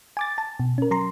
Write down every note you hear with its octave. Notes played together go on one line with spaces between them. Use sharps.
G#5 D6 A6
A5
B2
C#4 A#4
F#3 A#5 C6